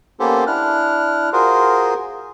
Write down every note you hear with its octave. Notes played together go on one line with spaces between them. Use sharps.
A#3 B3 C#4 G4 A4 C5
D4 E4 F6 F#6
F4 F#4 G#4 A#4 C5